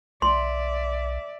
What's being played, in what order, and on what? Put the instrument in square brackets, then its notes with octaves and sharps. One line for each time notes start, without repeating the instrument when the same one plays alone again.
[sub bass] B1 [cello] D5 E5 [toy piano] C6